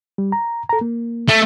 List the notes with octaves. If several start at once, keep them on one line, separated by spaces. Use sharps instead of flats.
G3
A#5
A4 A#5
A#3
A3